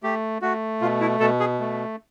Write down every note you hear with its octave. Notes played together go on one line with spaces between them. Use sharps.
A3 G4
A3 F#4
B2 F4
E4
B2 A4
G#4
A3